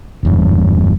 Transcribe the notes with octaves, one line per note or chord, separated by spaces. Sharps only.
F#1 E2 G2